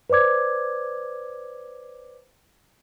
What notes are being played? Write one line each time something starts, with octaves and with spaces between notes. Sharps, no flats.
B4 C5 D5 D6 G#6